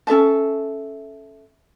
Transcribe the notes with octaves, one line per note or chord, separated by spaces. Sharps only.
C#4 A4 E5 A5